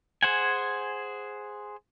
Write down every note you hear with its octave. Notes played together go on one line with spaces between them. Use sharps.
G#4 C5 F#5 G#5